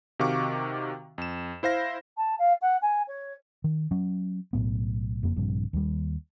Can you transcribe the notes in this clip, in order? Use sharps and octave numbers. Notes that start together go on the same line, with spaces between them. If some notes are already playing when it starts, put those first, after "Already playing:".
C3 D#3 F#4 F5 C#6 D6
F2 E7
E4 C5 F5 A#6
A5
F5
F#5
G#5
C#5
D#3
F#3 C#4
B1 A2 B3
F#1 F2 A#3
A#1 G2 C3
D#2 G3